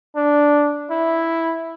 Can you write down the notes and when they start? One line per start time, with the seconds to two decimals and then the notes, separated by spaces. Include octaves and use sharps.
0.16 D4
0.91 E4